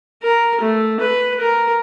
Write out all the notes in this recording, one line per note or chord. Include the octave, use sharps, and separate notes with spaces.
A#4
A3
B4
A#4